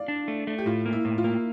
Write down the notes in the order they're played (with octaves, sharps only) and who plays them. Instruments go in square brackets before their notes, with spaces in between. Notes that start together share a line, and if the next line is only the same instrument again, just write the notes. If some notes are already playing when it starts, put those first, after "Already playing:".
Already playing: [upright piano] D5 F5
[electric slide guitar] D4
A3
A3
[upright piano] G4
[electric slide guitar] A2 [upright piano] F4
[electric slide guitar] A#3
[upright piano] E4
[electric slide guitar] A2
[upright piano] F4
[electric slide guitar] A#3